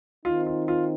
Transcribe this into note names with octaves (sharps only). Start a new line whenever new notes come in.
D#3 C4 D#4 F4
F4
F4